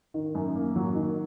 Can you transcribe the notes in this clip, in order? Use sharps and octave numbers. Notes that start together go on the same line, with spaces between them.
D#3
F#2
A#3
F#3
D#3